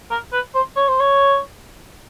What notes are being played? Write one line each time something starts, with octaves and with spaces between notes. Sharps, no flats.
A#4
B4
C5
C#5
C5
C#5